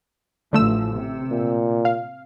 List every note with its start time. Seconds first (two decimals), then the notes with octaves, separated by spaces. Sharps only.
0.53 A1 D3 F3 A3 E6
0.94 C3
1.31 A#2
1.85 F5